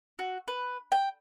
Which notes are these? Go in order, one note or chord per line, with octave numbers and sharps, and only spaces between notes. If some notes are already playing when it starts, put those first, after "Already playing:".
F#4
B4
G5